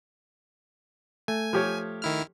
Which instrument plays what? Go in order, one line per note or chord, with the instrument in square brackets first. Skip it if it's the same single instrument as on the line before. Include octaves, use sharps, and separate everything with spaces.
[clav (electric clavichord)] A3 [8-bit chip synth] G#5
[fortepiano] F3 G4 C#5
[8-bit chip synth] D#3 E4 F6